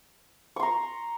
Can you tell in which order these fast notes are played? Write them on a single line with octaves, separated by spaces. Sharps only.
C#6 C6 A#5